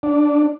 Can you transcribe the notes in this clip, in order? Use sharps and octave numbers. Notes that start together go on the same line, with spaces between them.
D4